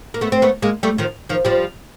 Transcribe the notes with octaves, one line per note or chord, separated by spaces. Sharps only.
A#3
A3 B3
C4
A3 B3
G#3 A#3
G3 A3
D#3 F3
D#3 F3
F3 G3